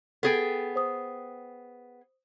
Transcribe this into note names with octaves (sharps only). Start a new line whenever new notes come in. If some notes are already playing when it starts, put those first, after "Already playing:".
B3 G#4 A4 G5 A6
C5 D#6